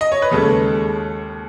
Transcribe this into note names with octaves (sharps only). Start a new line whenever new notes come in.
D#5
C#5
B4
D#2 C#3 G#3 A4